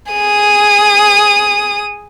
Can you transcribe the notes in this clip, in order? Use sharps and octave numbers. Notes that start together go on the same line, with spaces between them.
G#4 D#6